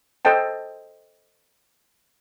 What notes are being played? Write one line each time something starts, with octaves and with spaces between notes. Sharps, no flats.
A4 C5 D#5 G5 A5